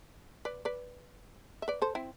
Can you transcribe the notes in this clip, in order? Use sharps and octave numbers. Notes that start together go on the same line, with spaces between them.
B4 D5
B4 D5
E5
B4 D5
A4 C5
C4 E4